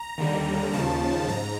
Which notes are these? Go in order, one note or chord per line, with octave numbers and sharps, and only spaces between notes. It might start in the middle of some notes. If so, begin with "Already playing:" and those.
Already playing: A#5
D#2 D3 G3
D#2 C#3 F3 A5
G#2 A#5